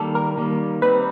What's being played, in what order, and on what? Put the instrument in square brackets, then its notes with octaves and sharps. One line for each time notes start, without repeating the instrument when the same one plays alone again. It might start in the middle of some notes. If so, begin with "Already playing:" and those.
Already playing: [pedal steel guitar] D#3 G3 A#3 [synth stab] A4
[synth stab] A#4
[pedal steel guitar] D#3 G3 A#3
[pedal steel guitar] G3 C4 D#4 [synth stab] B4